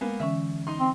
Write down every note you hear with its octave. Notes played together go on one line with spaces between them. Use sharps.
G#3 A#3 B3
D3 E3 C#4 E5
D#4 C6
C4